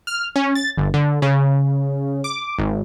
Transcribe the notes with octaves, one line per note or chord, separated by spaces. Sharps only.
F6
C#4
A6
G1
D3
C#3
D6
G#1